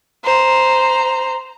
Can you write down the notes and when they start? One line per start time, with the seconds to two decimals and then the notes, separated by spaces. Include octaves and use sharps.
0.24 C5 A#5